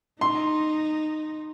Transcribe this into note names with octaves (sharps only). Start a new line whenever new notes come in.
D#4 C6